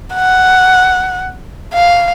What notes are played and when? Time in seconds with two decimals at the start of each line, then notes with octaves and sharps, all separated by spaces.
0.15 F#5
1.74 F5